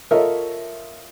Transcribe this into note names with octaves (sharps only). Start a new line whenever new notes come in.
F4 A4 A#4 C#5 D#5 E5